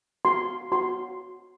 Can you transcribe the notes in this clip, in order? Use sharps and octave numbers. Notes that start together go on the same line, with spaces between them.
F#4 C6
F#4 C6